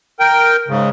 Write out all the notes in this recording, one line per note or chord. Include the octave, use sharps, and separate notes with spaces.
A#4 G5
G#2 C#3